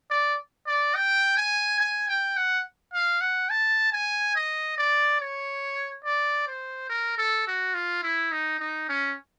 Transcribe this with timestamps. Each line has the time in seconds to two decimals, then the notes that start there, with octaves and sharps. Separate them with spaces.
0.10 D5
0.67 D5
0.95 G5
1.37 G#5
1.80 G#5
2.08 G5
2.37 F#5
2.94 F5
3.21 F#5
3.50 A5
3.92 G#5
4.36 D#5
4.78 D5
5.20 C#5
6.05 D5
6.47 C5
6.89 A#4
7.18 A4
7.47 F#4
7.74 F4
8.03 E4
8.31 D#4
8.60 D#4
8.89 C#4